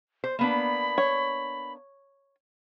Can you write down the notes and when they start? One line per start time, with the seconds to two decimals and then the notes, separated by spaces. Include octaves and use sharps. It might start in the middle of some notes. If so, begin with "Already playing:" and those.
0.24 C5
0.39 A#3 B3 D4 B5
0.98 C#5